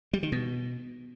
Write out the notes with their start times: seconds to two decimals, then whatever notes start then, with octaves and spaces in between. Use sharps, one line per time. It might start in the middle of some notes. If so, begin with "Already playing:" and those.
0.13 G3
0.23 D#3
0.32 B2